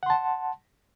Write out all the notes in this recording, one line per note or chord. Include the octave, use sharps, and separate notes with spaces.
F#5 A5 C6